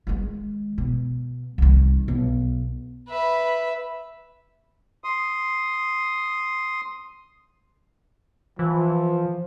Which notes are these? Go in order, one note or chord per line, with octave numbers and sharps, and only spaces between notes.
D#3 G#3
B2
C2 D#3
B1
B4 E5
C6 D#6
E3 F3